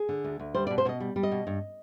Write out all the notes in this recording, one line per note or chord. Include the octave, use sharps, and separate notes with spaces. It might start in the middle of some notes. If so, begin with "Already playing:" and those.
Already playing: G#4
D3
D2
D2
G3 C5
D5
B2
C5
B2 D#5
G3
G3
D#5
B2
G2